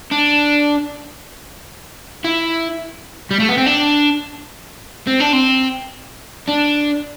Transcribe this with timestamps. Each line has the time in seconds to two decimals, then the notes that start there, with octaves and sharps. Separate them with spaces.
0.12 D4
2.24 E4
3.31 G3
3.40 A3
3.48 B3
3.58 C4
3.66 D4
5.07 C4
5.20 D4
5.33 C4
6.49 D4